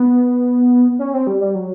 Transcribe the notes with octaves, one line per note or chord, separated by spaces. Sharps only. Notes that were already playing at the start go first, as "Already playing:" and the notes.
Already playing: B3
C#4
C4
G3
G3
F#3